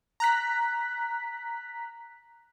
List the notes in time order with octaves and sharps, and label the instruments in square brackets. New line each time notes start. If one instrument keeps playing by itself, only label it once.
[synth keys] A#5 F#6 B6